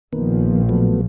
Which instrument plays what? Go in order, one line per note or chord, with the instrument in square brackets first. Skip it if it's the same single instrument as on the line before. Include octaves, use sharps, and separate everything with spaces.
[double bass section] A#1 F3 [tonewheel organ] D#3 A#3 B3
[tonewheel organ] F#3 A3 B3